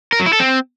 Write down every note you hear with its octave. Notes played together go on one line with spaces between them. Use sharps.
A#4
F#3
E4
A4
C4